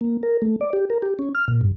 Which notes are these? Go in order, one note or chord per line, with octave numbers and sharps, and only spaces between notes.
A#3
A#4
A3
D5
G4
A#4
G4
C#4
F6
A#2
G2